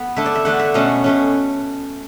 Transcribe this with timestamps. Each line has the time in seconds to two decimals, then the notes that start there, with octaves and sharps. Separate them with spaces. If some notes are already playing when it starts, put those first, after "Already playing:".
Already playing: B3 A4
0.16 D3 A3 D4 E5
0.26 D5
0.35 E5
0.45 D3 A3 D4 F#5
0.59 E5
0.74 B2 A3 C#4 F#5
1.04 B2 A3 C#4